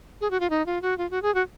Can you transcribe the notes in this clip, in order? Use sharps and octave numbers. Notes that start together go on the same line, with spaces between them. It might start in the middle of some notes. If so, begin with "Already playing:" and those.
G#4
F#4
F4
D#4
F4
F#4
F4
F#4
G#4
F#4